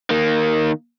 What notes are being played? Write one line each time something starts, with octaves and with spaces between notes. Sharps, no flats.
D#3 A#3